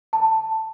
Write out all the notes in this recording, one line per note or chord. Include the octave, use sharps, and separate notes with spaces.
A5